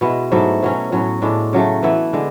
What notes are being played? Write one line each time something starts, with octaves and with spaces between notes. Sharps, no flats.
B2 G#3 B3 E4
G#2 F#3 A3 E4
B2 F#3 C#4
A2 F#3 C#4
A2 G#3 D4
C#3 F#3 A3
E3 B3 E4
D3 G#3